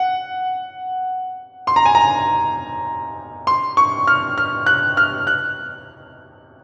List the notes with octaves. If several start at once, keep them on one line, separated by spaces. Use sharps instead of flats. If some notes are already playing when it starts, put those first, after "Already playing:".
Already playing: F#5
C6
A#5
G#5
A#5
C6
C#6
F6
F6
F#6
F6
F#6